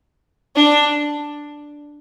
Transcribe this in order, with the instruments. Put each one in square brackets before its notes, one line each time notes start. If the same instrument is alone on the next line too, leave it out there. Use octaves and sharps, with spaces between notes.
[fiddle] D4